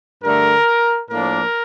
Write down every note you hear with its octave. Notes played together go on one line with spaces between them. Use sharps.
G2 D3 A3 A#4
A2 F3 A#3 D4 A#4